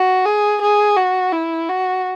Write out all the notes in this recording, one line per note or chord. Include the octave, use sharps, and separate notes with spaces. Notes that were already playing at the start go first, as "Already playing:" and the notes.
Already playing: F#4
G#4
G#4
F#4
E4
F#4